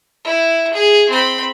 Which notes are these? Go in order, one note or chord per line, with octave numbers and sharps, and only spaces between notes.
E4
G#4
C4 B5